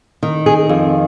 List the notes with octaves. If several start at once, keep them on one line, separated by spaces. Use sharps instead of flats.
D#3
G#4
F2